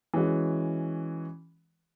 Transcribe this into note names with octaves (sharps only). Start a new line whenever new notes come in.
E3 G#3 C#4 F#4